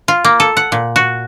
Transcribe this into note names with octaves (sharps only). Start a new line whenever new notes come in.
F4
A#3
A4
F#5
A#2
F#4